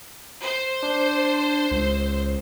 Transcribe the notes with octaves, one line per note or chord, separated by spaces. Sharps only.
C5
D4
C#2